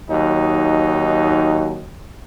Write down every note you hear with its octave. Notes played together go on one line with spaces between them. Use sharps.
D#2 F#3 D#4